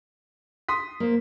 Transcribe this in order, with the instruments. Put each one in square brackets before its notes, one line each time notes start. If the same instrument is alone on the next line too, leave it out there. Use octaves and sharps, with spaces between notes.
[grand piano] C6 D#6 B6
[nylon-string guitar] A#3 C5